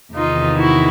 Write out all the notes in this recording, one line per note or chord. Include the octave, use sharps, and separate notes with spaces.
E2 C3 D#3 D#4 F4
E4 F#4